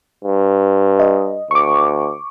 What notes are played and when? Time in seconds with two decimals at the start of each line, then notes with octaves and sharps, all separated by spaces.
0.24 G2
0.99 D#5
1.51 D2 C#6 D6